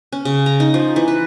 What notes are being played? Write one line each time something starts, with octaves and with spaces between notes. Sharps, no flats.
C#4
C#3
A#5
D#4
F3
E3
B4